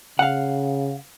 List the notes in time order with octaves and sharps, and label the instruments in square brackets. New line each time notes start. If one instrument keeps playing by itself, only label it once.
[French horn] C#3 [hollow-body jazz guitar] F5 F#5